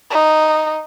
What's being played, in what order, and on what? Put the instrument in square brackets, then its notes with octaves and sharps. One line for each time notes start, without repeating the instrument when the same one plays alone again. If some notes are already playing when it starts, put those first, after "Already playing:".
[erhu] D#4